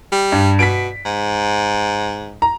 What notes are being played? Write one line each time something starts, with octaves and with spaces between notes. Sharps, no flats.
G3
G2
B2 B6 D7
G#2
A#5